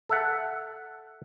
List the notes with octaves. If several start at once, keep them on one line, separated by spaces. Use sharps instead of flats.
A4 E5 F#5